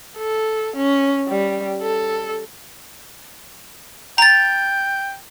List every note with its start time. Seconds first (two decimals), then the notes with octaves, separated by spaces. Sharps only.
0.18 A4
0.77 C#4
1.29 G3
1.82 A4
4.18 G5 A#5 A6